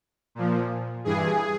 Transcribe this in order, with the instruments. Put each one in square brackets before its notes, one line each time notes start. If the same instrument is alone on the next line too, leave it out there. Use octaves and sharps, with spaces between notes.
[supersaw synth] A#2 F3
G2 E3 G#4